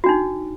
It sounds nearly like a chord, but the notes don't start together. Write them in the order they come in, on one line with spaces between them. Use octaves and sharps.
F#4 D4 D#4